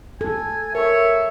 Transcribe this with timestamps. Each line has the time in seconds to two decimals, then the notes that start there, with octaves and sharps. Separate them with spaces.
0.21 A4 G#5
0.75 A#4 C#5 E5 C#6